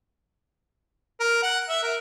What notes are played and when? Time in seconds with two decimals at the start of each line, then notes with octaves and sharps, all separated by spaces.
1.20 A#4
1.43 F#5
1.69 E5
1.82 A#4